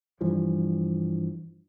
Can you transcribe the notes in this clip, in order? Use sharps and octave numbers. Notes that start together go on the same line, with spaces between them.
G2 E3 F3 G3